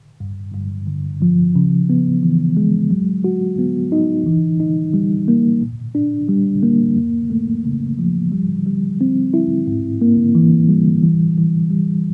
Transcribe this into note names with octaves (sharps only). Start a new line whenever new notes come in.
G2
G2
D3
F3
C#3
B3
E3
G#3
F#3
F#4
B3
D#4
E3
D#4
G3
A#3
A#2
D4
G3
A#3
F2
A3
C#3
F3
G3
G3
C4
E4
G#2
A#3
E3
G3
E3
E3
G3